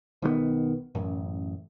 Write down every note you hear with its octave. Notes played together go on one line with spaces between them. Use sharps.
B1 D#3 G3 B3
A1 F#2